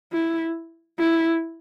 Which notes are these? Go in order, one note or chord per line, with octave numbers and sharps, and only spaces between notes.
E4
E4